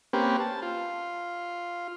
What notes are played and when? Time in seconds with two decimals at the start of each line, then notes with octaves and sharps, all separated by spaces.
0.13 A#3 C4 C#4 G4 B4
0.40 A5
0.62 F4